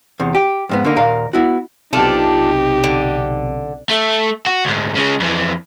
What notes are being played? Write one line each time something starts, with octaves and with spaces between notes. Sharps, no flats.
E2 C3
G4
F2 G#2 B3
D3 D#3 A#3 D#4
D#2 A#2 A#4 F5
B3 E4 F#4
B1 C3 D4 D#4 F4 G4 A4
D3
A3
F#4
D2 G#2
C#3 G#3
F2 E3